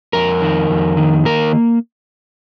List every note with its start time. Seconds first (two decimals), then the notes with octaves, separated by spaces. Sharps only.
0.13 F2 A#4
0.42 D#3
0.70 F2
0.97 D#3
1.25 A#3 A#4